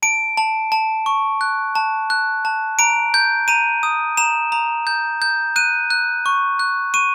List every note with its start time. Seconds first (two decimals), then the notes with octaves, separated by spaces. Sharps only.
0.02 A5 D7
0.37 A5
0.72 A5
1.06 C#6
1.41 F#6
1.75 A5
2.10 F#6
2.45 A5
2.79 A#5 D7
3.14 G6
3.48 A#5 D#7
3.83 D#6
4.17 A#5 E7
4.52 A#5
4.87 G6
5.22 G6
5.56 F#6 D#7
5.90 F#6
6.26 C#6
6.59 F#6
6.94 C#6 D#7